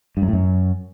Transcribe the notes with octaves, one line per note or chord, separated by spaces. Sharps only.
G2
F#2
A2
F#2